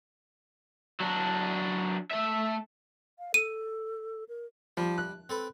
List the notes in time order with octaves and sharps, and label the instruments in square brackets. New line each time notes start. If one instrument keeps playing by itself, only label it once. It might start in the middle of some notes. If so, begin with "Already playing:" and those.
[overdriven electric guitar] F#3 D4
A3 E5
[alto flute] F5
[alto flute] A4 [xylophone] D#7
[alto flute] A#4
[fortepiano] F3 [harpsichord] G3
[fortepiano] F#6
[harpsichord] C4 A4 B4